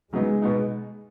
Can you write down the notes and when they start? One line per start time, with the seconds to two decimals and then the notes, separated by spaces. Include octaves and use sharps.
0.12 C#3 F#3 G#3 B3 D#4
0.42 B2 B3 D#4